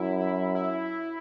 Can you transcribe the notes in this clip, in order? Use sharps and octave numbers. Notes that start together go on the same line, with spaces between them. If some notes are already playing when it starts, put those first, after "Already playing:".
Already playing: F#2 E4
E4